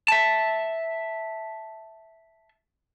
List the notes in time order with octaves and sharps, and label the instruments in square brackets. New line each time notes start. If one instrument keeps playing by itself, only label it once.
[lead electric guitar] E5 A5